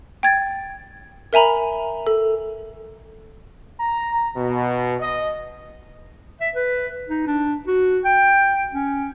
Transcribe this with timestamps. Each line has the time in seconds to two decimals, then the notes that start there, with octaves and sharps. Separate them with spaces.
0.23 G5 G#6 A6
1.33 A#4 E5 G#5 A#5 B5
2.07 A4
3.79 A#5
4.36 B2
5.00 D#5
6.41 E5
6.55 B4
7.09 D#4
7.27 D4
7.68 F#4
8.05 G5
8.73 C#4